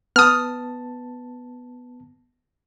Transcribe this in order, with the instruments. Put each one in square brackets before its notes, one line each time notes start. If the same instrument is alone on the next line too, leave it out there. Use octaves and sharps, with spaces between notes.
[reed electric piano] B3 A5 [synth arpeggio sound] D#6 F6